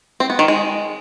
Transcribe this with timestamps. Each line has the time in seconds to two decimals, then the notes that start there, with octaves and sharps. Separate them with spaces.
0.20 C4
0.30 B3
0.39 D#3
0.48 G#3